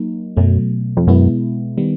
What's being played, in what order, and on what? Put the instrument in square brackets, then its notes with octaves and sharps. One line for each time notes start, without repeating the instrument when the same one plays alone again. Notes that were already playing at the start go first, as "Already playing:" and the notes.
Already playing: [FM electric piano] F#3 A#3 D#4
[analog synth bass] F#2 [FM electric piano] B2 F#3 A3
[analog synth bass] F2
[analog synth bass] F#2 [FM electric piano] B2 G#3 B3 E4
[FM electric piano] D#3 G3 B3